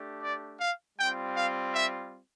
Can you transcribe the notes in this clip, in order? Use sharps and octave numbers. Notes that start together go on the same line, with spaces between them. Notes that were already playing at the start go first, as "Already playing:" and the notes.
Already playing: A3 D4 G4
D5
F5
G3 C4 F4 G5
F5
E5